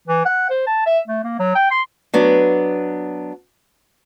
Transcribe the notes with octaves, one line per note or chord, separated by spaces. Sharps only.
E3
F#5
C5
A5
E5
A3
A#3
F#3
G5
C6
F#3 B3 D4